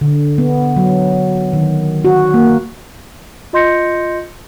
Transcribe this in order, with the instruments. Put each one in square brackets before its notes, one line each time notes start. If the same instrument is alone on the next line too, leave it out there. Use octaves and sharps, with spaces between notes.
[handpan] D3
B3
F#3
D#3
F#4
A#3
[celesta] F4 D#5 C6 G6 A#6 C#7